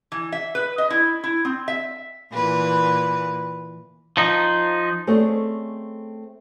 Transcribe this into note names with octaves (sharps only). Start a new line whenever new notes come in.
E3
E5
B4
D#5
E4
E4
C4
E5
A#2 E3 B4
F3 D#4
A3 C4 C#4 G#4 D5 D#5